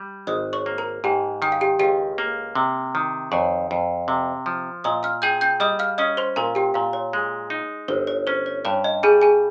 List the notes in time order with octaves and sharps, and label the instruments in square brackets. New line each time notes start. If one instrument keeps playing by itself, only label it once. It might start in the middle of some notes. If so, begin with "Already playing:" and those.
Already playing: [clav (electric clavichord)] G3
[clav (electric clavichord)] G#1 [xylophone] D#5 D#6
[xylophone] C#5 C#6
[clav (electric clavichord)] A#3
[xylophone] A#4 A#5
[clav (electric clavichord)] G#2 [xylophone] G4 G5
[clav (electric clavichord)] D#3 [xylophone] G5
[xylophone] F5
G4 G5
[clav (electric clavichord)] C#2 [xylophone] G4 G5
[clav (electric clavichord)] A#3
C3
D#3
[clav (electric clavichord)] F2 [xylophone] C#5 C#6
[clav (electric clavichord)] F2
C3
F3
[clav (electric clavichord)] A#2 [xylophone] D#5 D#6
[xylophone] F5 F6
[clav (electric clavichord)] G#4 [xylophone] G5 G6
[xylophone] G5 G6
[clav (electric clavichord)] G3 [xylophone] D#5 D#6
[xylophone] F5 F6
[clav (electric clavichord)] C#4 [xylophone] D#5 D#6
[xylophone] C5 C6
[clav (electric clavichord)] A#2 [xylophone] A#4 A#5
[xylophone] G4 G5
[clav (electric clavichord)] A#2 [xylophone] F5
[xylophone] C#5
[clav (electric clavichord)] G#3
D#4
[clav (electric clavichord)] G1 [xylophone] C5
[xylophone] C#5
[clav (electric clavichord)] C#4 [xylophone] C5
[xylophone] C#5
[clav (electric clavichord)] G2 [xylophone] C#5
[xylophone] D#5
[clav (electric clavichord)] G3 [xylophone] G#4 G#5
[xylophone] G#4 G#5